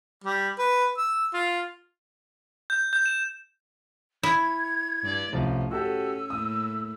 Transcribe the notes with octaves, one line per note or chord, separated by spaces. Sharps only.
G3
B4
E6
F4
G6
G6
E7
E4 G#6
G2 D5
C2 A2 F3 C#4
C#4 F#4 G4 A4 E6
A2 A#3 D#6